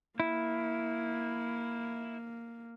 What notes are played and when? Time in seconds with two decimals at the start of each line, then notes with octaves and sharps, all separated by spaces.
0.20 A#3 E4